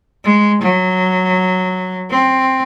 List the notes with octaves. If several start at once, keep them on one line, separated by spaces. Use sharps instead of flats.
G#3
F#3
C4